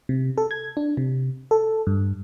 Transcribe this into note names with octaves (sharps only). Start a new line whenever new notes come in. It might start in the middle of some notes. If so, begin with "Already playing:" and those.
C3
A4
G#6
D4
C3
A4
G2